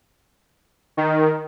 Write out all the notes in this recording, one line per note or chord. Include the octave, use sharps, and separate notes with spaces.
D#3